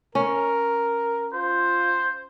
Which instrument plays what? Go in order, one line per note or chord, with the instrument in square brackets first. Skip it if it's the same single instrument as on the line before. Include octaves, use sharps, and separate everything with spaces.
[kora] C#4 [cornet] A#4
[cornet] F4 [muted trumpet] C5